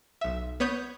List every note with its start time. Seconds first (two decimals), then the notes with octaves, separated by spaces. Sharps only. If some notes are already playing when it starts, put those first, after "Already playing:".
0.21 B1 E5
0.60 B3 C#5 D#6 G6